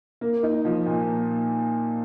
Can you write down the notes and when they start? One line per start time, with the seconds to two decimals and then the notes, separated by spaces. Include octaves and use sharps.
0.21 A#3
0.43 D#4
0.65 F3
0.86 A#2